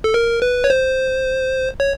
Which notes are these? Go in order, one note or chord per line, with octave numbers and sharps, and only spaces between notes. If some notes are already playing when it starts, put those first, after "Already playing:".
A4
A#4
B4
C#5
C5
C#5